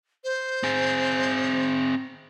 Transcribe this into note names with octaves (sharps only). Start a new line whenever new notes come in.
C5
C4 G#4